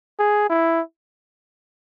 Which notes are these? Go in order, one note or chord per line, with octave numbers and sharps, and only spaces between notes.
G#4
E4